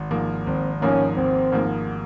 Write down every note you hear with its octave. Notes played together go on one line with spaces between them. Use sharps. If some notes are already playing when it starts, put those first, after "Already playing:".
Already playing: G#1
G#2 F3 A#3
G#1 C4
G#2 F3 A#3 C#4
G#1 C4
G#2 F3 A#3